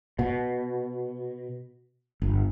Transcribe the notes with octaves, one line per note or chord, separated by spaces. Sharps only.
B2
G1